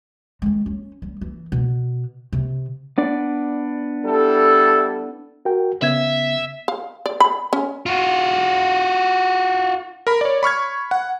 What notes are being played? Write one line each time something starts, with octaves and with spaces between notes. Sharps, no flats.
D#3 G#3
C#4
G3
E3
B2
C3
B3 D4 D5
G3 E4 A4
F#4 A#4 G5
C#3 B3 E5 G#6
F5
D5
B5
C#4
F4 F#4
A#4 B5
C#5 D5
B5 C#6 F6 G#6
F#5